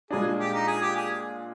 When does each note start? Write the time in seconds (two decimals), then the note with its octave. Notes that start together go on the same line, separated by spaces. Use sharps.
0.10 A#2 G#3 D4 G#4
0.39 G4
0.53 D#4
0.67 G#4
0.82 G4
0.96 G#4